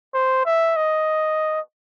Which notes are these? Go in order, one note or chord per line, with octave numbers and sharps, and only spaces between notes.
C5
E5
D#5